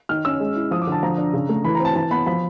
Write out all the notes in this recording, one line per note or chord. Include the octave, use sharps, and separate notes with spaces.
D#3 F6
C#4 E6
G#3
E4
F3 D#6
D6
D3
A5
F3 A#5
D4
C#3
A3
E3 B5
A#5
C4 A5
E3 A5
B3 B5
F3 B5